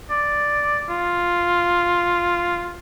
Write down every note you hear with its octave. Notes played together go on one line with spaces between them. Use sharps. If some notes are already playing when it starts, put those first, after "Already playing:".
D5
F4